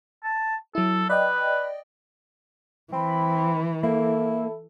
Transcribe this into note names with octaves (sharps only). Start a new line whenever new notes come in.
A5
F#3 E4 A4
B4 D5 D#5 G5
E3 C4 B5
A#3 E4 A4